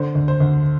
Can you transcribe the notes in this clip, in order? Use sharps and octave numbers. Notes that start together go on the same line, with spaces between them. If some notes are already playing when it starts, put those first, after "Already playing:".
Already playing: D3 C5
D2
C5
D2